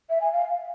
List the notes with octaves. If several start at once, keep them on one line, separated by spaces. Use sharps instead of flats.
E5
G#5
F5